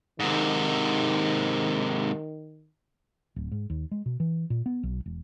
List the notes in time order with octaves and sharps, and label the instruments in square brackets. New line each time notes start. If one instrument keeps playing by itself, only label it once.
[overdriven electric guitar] G#2 C3 [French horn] D#3
[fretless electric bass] D1
G#2
D#2
G#3
B2
E3
A#2
B3
B1
E1